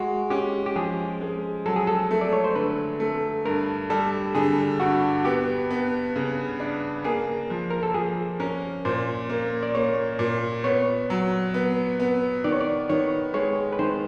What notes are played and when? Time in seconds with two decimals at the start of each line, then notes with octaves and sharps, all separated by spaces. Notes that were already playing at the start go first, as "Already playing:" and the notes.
Already playing: G#3 F#4
0.30 C#4 G4
0.66 G4
0.76 F3 G#4
1.21 G#3
1.66 F#3 A4
1.76 G#4
1.87 A4
2.11 A3
2.21 D5
2.33 C#5
2.44 C5
2.56 D3 B4
3.00 A3
3.46 G2 A#4
3.90 G3 A4
4.35 D3 G#4
4.80 G2 F#4
5.25 B3 G4
5.71 B3
6.16 C#3
6.60 D4
7.04 A#3 G#4
7.50 F3
7.70 A#4
7.83 A4
7.94 F3 G#4
8.40 C#4 A#4
8.85 A#2 C5
9.30 A#3
9.63 D5
9.75 A#3 C#5
10.19 A#2
10.64 B3 C#5
11.10 F#3
11.54 B3
12.00 B3
12.44 D#3 D5
12.52 C#5
12.61 D5
12.89 D#3 C#5
13.34 G#3 C#5
13.72 B4
13.79 D#3 C5